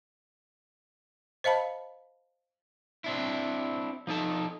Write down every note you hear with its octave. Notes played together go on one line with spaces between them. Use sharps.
C5 D#5 F5 A5 B5
C4 D4 E4
F3 D#4 A4 A5